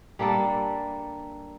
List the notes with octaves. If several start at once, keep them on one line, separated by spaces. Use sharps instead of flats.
G3 A#3 D4 A4